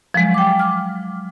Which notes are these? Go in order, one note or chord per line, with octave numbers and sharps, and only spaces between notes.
F3 F#3 G#3
G5 D6
D6 F6